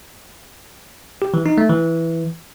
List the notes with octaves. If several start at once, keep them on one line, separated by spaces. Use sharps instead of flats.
G4
E3
D#4
A3
E3